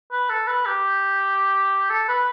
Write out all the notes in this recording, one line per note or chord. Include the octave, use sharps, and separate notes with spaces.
B4
A4
B4
G4
A4
B4